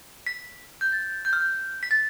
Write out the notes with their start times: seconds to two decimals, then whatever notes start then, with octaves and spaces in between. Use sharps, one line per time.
0.27 B6
0.81 G6
0.92 A6
1.25 G6
1.33 F6
1.41 G6
1.83 B6
1.91 A6